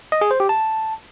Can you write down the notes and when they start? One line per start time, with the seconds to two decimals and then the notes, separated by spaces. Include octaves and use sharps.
0.12 D#5
0.21 G#4
0.31 C5
0.40 G4
0.49 A5